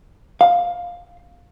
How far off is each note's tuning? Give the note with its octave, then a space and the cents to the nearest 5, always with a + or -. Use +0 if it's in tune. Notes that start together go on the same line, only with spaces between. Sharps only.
F5 +10